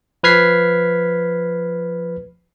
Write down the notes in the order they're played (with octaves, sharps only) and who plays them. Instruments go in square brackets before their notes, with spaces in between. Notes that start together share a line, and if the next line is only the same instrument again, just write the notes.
[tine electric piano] F3 B4 F6 G#6 B6 C7